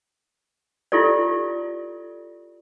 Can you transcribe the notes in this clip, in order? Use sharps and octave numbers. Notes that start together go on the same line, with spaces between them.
E4 F4 G4 A4 D5